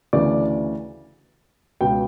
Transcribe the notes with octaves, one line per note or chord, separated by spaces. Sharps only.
D2 C#3 E3 D5
C#2 B2 G5